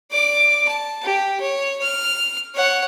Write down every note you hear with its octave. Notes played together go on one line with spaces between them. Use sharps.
D5 D6
A5
G4
C#5
F6
C#5 F#5